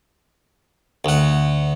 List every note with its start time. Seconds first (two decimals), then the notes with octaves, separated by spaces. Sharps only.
1.05 D2 F#5